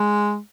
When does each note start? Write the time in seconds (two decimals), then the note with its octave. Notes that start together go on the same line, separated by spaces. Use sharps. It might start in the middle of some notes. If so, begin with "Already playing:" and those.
Already playing: G#3